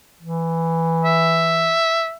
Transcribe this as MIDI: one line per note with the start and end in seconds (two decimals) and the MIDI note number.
0.23 1.74 52
1.04 2.14 76